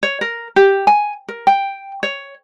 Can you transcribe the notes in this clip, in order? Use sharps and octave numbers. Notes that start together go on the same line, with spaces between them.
C#5
A#4
G4
G#5
A#4
G5
C#5